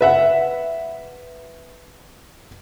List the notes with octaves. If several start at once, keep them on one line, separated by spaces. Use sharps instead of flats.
B4 E5 F#5